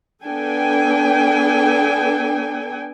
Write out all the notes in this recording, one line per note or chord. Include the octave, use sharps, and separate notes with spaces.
B3 D4 A4 G5 G#5